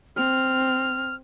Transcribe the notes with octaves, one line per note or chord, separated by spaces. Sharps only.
C4 F6